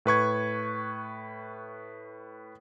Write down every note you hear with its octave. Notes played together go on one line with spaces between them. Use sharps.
A2 B4 C#6 G#6